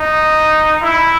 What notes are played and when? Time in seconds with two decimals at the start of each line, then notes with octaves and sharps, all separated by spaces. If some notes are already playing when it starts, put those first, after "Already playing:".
Already playing: D#4
0.82 E4